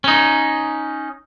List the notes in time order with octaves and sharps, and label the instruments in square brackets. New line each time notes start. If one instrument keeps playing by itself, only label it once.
[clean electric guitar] C#4 D#4